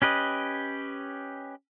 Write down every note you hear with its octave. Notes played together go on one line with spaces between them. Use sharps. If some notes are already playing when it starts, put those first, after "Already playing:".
C#4 G4 B4 D#5